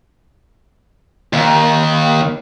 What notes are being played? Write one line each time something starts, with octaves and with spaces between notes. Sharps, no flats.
D#2